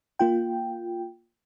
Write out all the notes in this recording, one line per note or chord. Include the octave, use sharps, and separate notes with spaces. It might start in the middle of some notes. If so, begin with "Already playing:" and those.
A#3 F4 G5